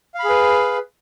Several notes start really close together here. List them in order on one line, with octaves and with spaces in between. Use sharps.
F5 B5 G#4 B4